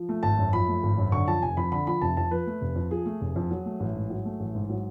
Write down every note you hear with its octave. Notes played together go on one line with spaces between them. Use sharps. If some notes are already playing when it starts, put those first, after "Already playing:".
Already playing: F3
A3
G#1 A5
F#2
F3 B5
A3
G#1
F#2
D3 C#6
F3 A5
F1 G#5
F2 B5
D3 B5
F3 B5
F1 A5
F2 A5
F3 B4
A3
F1
F2
F3 G#4
A3
F1
F2
F#3
A3
A1
G#2
F#3
A3
A1
G#2
F#3